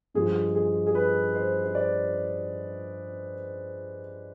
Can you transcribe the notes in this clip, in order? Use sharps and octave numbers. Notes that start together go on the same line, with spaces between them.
G2 F3 G#3 G#4
G#4
G#4
B4
C5
C5
D5